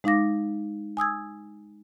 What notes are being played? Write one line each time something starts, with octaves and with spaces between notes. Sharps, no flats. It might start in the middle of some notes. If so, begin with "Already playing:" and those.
G#3 D#4 F5 D6 A#6
G#5 D#6 E6 G#6